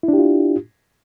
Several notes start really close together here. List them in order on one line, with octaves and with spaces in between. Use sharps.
E4 D4 G4 F4